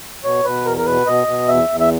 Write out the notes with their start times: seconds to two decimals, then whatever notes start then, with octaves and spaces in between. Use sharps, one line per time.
0.24 B2 C#5
0.45 B2 B4
0.66 E2 A#4
0.78 A#4
0.86 B2 B4
1.07 B2 D#5
1.27 B2
1.48 E2 E5
1.69 E2
1.80 E5